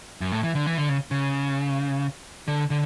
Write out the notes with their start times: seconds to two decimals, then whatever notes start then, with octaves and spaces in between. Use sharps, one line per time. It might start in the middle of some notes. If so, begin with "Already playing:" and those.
0.21 F#2
0.32 A2
0.43 E3
0.55 D3
0.66 E3
0.78 D3
0.89 C#3
1.11 C#3
2.48 D3
2.70 D3